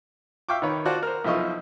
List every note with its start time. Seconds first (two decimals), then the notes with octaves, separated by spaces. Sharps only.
0.49 E5 F5 G5 C#6 D6
0.62 D#3 B4 C#5
0.85 F4 F#4 C5 D5 F#5 A5
1.03 A#4 C5
1.24 B1 F3 E4 F4 D#5 C#6